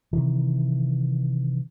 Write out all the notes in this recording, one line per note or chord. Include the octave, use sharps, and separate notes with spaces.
C3 D#3 E3